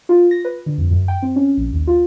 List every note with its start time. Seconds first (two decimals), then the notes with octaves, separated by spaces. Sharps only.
0.09 F4
0.31 A#6
0.45 B4
0.66 D3
0.78 F2
0.91 F#2
1.08 G5
1.22 C4
1.36 C#4
1.57 A#1
1.73 D#2
1.87 F4